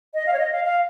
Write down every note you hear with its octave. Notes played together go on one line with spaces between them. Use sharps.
D#5
F5
C#5
D#5
F5
F5